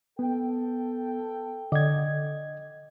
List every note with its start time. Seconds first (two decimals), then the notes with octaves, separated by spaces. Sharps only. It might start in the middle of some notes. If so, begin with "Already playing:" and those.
0.19 B3 A4 G5
1.72 D3 D#5 G#6